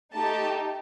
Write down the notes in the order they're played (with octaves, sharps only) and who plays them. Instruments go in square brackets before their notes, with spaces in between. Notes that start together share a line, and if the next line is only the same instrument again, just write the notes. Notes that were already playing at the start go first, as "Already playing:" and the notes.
[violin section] A3 D#4 G4 A5